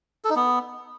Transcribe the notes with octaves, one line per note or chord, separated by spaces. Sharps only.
A4
D#4
B3